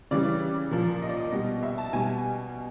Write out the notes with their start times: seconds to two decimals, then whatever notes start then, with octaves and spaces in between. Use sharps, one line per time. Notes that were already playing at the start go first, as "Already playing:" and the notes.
0.11 C#3 E3 G3 D5
0.71 A#2 F3
1.02 D#5
1.09 D5
1.17 D#5
1.32 B2 G3
1.63 E5
1.78 A5
1.93 B2 G3 G#5